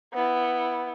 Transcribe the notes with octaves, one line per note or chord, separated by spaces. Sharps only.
B3 E4